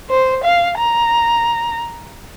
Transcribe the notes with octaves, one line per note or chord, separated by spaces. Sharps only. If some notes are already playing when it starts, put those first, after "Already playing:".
C5
F5
A#5